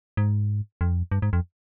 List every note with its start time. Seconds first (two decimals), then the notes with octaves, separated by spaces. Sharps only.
0.17 G#2
0.81 F2
1.12 G2
1.22 G#2
1.33 F2